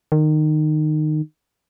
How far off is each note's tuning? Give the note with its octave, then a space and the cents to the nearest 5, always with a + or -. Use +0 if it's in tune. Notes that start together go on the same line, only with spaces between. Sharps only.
D#3 -20